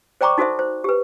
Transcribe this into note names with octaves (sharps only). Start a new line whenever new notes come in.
C5 D5 G5 A#5 C#6 D6
D#4 F#4 A4 C5 E5
C5
G4 B4